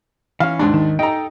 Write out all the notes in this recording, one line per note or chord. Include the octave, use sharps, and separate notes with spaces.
E3 C#4 F5
D#2 G#2 D4
D#3
D#4 A4 G5 A#5